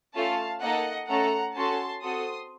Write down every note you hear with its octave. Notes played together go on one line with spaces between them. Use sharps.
A3 C#4 F4 A4 F5 A5
A#3 D#4 A4 D#5 F#5
A3 C#4 A4 F#5 A#5
C#4 F#4 A4 A5 C6
C4 F#4 A4 C6 D#6